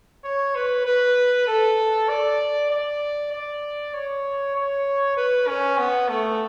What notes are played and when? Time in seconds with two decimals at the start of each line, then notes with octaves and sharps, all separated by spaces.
0.24 C#5
0.56 B4
0.86 B4
1.47 A4
2.09 D5
2.71 D5
3.33 D5
3.94 C#5
4.56 C#5
5.17 B4
5.48 C#4
5.78 B3
6.09 A3